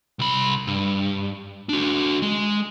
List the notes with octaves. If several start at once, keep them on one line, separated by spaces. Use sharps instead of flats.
C2 B5
G2
D4 F#4
G#3